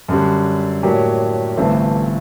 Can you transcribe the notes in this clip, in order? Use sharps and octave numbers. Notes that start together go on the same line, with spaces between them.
F#2 D3 G3
A2 F#3 A#3 D4 G4
G1 G2 E3 A3 C4